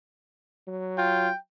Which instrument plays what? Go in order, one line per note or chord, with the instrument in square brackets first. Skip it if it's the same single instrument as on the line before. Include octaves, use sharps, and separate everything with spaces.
[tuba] F#3
[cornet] F4 [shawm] G5